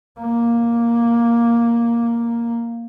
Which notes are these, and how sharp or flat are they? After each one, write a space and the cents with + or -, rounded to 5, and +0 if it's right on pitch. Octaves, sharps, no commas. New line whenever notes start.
A#3 +5